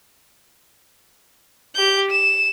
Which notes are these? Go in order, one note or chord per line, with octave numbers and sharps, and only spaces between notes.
G4 G6
E7